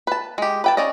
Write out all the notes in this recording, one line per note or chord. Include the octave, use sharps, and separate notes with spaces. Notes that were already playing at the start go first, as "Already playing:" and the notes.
B4 A5
G#3 G4
B4 G5 A5
C#4 D5 D#5